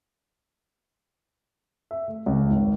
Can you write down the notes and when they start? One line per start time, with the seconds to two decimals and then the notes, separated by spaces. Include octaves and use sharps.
1.91 E5
2.08 A3
2.26 C#2
2.51 G#1